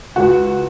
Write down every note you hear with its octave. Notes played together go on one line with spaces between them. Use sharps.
C#2 F#4